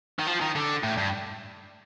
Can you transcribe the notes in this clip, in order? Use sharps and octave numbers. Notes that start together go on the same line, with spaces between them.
D#3
F3
D#3
D3
A2
G2